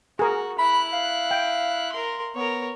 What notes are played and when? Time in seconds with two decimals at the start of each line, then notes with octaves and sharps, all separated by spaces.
0.19 F#4 G#4 A#4
0.59 E4 B5 F#6
0.93 F5
1.31 G5
1.93 A#4 C6
2.36 B3 A#4 C#5